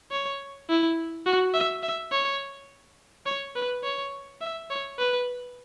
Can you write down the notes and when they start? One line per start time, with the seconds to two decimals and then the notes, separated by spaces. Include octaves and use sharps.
0.11 C#5
0.68 E4
1.26 F#4
1.54 E5
1.83 E5
2.12 C#5
3.26 C#5
3.55 B4
3.84 C#5
4.41 E5
4.70 C#5
4.99 B4